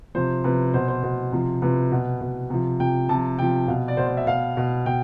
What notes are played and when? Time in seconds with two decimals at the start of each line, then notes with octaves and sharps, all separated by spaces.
0.15 C3 F3 C5
0.44 C3 F3 B4
0.74 B2 C5
0.88 C5
1.03 B2
1.32 C3 F3
1.62 C3 F3 B4
1.92 B2 B4
2.21 B2
2.50 C3 F3
2.80 C3 F3 G5
3.09 C3 F3 A5
3.39 C3 F3 G5
3.68 B2 F5
3.88 D5
3.97 B2 C5
4.07 C5
4.17 E5
4.27 B2 F5
4.57 B2
4.86 B2 G5